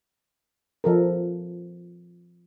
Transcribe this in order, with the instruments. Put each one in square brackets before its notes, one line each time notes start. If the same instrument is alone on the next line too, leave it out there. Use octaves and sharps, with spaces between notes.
[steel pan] F3 A4 A#4